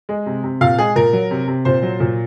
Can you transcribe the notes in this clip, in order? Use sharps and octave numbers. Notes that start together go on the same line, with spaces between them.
G#3
C3
C3
A#2 F5
G#3 G#4
A#2 A#4
F#3
C3
C3
A#2 C5
F#3
A#2